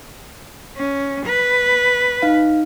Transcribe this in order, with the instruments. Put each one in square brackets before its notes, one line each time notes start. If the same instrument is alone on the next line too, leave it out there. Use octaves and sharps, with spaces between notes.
[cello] C#4
B4
[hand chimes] D#4 F5